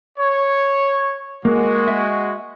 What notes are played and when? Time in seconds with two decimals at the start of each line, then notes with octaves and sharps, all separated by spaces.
0.19 C#5
1.45 G#3 A#3 F#4
1.88 E5